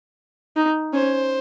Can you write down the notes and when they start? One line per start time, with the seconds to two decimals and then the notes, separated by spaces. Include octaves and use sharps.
0.56 D#4
0.93 C#4 C5